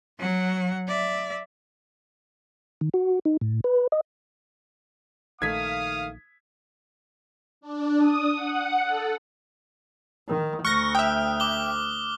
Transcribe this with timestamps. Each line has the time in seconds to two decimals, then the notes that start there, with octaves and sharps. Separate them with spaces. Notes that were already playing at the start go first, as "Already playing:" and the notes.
0.19 F#3 F#5
0.88 D5 E5
2.81 D#3
2.94 F#4
3.25 D#4
3.41 A2
3.64 B4
3.92 D#5
5.42 A#1 D#3 A3 F5 D#6 G#6 B6
7.61 D4
7.98 D#6
8.34 F#5
8.83 A4
10.28 D#3
10.65 D2 C#6 F6 F#6 A#6
10.95 E5 G5 D#6
11.40 D6 G7